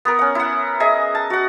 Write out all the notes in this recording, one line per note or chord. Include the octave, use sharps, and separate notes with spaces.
B3 A#4
C#4 F#5
E4 F#5
G#4 D#5 E5
A5
F#4 F#5